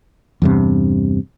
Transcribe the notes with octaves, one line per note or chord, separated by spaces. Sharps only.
E2 G2 C3